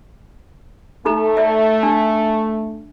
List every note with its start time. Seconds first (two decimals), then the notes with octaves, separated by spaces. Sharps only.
1.05 A3 D#4 A4 A#5
1.37 D5 E5
1.83 D4